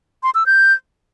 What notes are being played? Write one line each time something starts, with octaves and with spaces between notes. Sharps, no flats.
C6
E6
G6